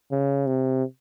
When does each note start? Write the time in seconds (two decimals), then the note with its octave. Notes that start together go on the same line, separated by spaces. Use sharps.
0.12 C#3
0.47 C3